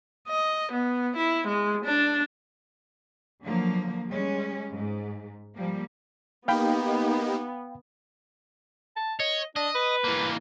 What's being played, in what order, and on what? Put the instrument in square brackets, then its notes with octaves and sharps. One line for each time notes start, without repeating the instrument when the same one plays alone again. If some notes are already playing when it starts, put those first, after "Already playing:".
[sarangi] D#5
B3
E4
G#3
D4
[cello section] D3 F3 F#3 A#3
G3 G#3 C#4
G#2
F3 G3 A#3
[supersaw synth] A#3 D#4 G4 [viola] B3 [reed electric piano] F5 G5 B5
[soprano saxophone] A5
[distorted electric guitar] C#5 [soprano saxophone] D#5
[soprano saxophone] D4 [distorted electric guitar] D#5
[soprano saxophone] B4
[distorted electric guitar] E3 A#3